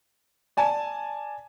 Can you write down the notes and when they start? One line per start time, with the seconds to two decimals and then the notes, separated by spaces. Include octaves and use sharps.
0.57 D5 G#5 A5